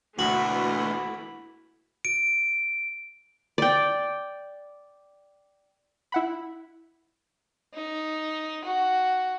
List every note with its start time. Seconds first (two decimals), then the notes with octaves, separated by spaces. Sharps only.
0.19 D2 B2 E3 A3 A#3 E4 F#4
2.05 D7
3.58 D5 G5
6.12 E4 F#5 B5
7.74 D#4
8.64 F#4